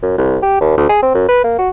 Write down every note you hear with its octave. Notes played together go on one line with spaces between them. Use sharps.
F#2
C2
G4
D#2
D2
G#4
C4
F#2
B4
A#3
F#4